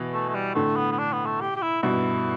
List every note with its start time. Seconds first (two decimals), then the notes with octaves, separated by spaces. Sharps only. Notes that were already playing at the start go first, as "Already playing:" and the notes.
Already playing: B2 E3
0.13 A3
0.29 A3
0.35 G3
0.55 A2 D3 A3
0.77 B3
0.92 B3
0.99 D4
1.12 B3
1.26 A3
1.41 G4
1.56 G4
1.62 E4
1.82 G2 B2 E4